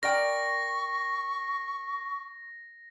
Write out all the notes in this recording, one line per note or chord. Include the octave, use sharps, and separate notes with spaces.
A#4 D5 G5 C#6 A#6